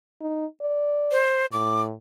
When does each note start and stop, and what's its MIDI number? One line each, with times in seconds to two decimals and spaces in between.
0.21 0.46 63
0.61 1.21 74
1.12 1.46 72
1.52 1.94 45
1.52 1.81 86